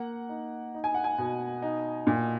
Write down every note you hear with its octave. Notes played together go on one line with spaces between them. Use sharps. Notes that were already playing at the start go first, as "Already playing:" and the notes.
Already playing: A#3 F#5
D#4
D#4
G#5
F#5
G#5
B2
D#4
A#2